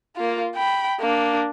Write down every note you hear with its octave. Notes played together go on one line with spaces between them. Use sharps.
A#3 F4
G5 B5
A#3 D4